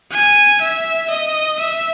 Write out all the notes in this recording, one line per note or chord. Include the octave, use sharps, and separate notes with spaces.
G#5
E5
D#5
E5